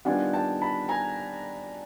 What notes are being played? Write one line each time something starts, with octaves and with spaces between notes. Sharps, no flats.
D#3 G3 B3 D4 F4 F#5 G#5
G5 A5
A5 B5
G#5 A#5